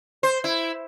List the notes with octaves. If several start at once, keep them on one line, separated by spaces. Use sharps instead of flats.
C5
E4